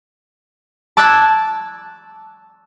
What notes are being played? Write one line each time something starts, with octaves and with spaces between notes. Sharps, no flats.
A5 D6 E6 F#6 G#6 A6